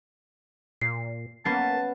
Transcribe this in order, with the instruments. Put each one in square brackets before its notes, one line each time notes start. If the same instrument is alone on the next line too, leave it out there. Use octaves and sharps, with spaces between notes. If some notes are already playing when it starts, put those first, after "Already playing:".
[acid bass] A#2 [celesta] C7
[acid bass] A#3 [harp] B3 C#4 [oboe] A5 [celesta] C7